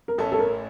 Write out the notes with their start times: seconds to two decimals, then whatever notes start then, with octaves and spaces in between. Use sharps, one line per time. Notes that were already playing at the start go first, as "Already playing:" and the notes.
0.08 A#4
0.18 A1 A2 A3 C#4 A4
0.32 A4
0.39 A#4